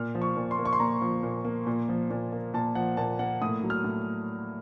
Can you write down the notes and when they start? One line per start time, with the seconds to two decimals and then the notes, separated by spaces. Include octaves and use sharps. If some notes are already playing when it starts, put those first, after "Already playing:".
Already playing: A#2 F6
0.15 F3
0.22 C#6
0.36 A#2
0.51 C6
0.58 A#3
0.65 C#6
0.73 C6
0.80 A#2 A#5
1.02 F3
1.23 A#2
1.45 A#3
1.67 A#2
1.89 F3
2.10 A#2
2.32 A#3
2.54 A#2 A5
2.75 F3 F#5
2.97 A#2 A5
3.19 A#3 F#5
3.42 A2 D#6
3.63 F#3
3.70 F6
3.84 A2